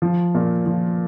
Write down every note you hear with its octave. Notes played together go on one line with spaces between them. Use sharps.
F3
A#2
F3